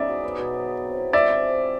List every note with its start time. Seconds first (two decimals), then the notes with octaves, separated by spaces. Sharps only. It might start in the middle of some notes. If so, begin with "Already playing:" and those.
Already playing: C#3 D#4 D5 E5
0.09 F#3
0.24 B3
0.39 B2
0.54 F#3
0.68 G#4
0.84 C4
0.98 E4
1.13 G#3 D5 E5
1.28 C3
1.43 F3
1.58 E4